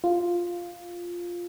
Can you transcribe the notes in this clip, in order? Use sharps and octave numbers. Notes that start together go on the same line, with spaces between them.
F4